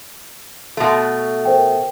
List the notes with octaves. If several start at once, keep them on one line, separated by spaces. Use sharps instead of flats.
B2 A3
A#4 C5 G5